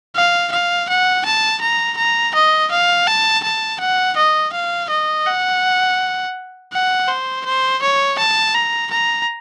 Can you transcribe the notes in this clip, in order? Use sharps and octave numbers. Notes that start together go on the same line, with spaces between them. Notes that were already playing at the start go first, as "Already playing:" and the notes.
F5
F5
F#5
A5
A#5
A#5
D#5
F5
A5
A5
F#5
D#5
F5
D#5
F#5
F#5
C5
C5
C#5
A5
A#5
A#5